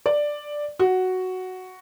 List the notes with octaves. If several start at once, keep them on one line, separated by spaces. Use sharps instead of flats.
D5
F#4